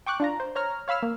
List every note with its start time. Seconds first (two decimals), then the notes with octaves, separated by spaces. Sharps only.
0.06 G5 C#6 D6 F#6
0.20 D4 F4 A#5
0.40 C5
0.55 C5 C#5 A#5 F6
0.88 C#5 F5 B5 E6 F6
1.03 A#3